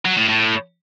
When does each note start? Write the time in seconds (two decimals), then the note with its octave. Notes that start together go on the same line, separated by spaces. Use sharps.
0.05 F#3
0.17 A2
0.29 A2